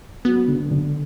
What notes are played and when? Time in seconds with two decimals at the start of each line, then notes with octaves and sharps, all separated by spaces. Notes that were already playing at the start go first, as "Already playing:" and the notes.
0.25 F#3 B3
0.48 D3
0.71 D3